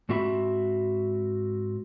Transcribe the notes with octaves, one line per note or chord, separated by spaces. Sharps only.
G#2 C4 F#4 E5 B5